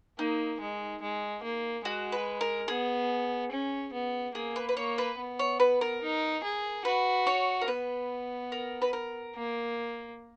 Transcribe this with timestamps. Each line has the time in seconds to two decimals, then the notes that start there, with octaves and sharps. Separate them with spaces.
0.19 A#3 D#4
0.60 G#3
1.02 G#3
1.43 A#3
1.85 G#3 F#4
2.12 B4
2.41 A#4
2.68 B3 G#4
3.51 C#4
3.93 B3
4.35 A#3 G#4
4.56 B4
4.69 B4
4.77 A#3 C#5
4.98 B4
5.18 B3
5.39 C#5
5.60 B4
5.81 A#4
6.02 D#4
6.44 G#4
6.85 F#4 B4
7.27 C#5
7.61 A#4
7.68 B3 B4
8.52 A#4
8.82 B4
8.93 A#4
9.35 A#3